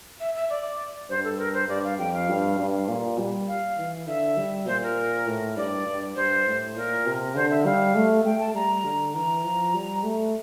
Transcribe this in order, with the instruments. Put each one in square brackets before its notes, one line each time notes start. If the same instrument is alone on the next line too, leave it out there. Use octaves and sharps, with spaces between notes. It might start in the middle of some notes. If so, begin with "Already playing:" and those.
[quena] E5
E5
D5
[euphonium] G2 [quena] C5
[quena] A4
A#4
C5
[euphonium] G2 [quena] D5
[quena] F5
[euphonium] F2 [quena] G5
[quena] F5
[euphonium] G2
G2
A#2
G3
[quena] F5
[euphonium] E3
[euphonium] D3 [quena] E5
[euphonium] G3
[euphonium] A#2 [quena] C5
[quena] A#4
[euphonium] A2
[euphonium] G2 [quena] D5
[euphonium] G2
[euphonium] G2 [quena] C5
[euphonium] A2
[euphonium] A#2 [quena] A#4
[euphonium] C3
[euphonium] D3 [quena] C5
[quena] E5
[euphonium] G3 [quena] F5
[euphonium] A3
[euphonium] A3 [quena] G5
[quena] A5
[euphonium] G3 [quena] A#5
[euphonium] D3
[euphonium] E3 [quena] A#5
[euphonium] F3
G3
A3